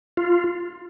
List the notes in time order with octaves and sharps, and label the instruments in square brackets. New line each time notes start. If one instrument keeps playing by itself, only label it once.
[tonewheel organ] F4